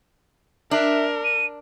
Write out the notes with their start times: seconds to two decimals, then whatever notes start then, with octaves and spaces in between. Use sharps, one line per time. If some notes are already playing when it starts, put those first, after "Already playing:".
0.71 D4 A#4 E5
1.24 D#7